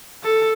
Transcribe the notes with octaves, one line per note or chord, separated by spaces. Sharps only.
A4